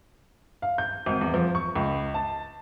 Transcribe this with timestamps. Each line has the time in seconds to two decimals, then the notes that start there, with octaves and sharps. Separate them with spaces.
0.62 F5
0.78 G6
1.06 G#1
1.21 E2
1.34 F3
1.55 C#6
1.76 C#2
2.14 A5